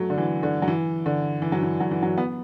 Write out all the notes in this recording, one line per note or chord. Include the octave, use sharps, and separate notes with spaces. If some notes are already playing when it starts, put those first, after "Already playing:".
Already playing: F#3 A3
D3
E3
D3
F#3
E3
D3
E3
F#3
E3
F#3
E3
F#3
B3